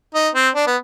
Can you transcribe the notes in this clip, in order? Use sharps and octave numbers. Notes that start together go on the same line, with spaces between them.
D#4
C4
D4
B3